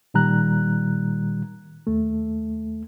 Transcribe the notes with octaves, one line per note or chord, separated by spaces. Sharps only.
A#2 D#3 G3 A#5 F#6
D#2 A3